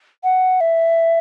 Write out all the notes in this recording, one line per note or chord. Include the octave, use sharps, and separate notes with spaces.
F#5
E5